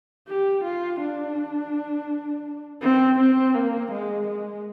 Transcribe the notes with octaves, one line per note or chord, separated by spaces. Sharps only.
G4
F4
D4
C4
C4
A#3
G#3
G#3